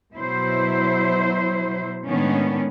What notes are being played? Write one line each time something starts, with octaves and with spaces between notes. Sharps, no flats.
B2 F#3 E4 C5
A2 D#3 G#3 B3 C#4 D4